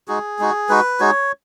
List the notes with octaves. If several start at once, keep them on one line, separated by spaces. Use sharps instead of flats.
G#3 D#4 F#4 G#4
G#3 D#4 F#4
G#3 D#4 F#4 B4
G#3 D#4 F#4 C#5